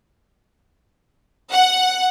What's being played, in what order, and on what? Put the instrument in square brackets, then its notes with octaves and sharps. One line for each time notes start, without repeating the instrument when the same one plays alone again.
[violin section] F#5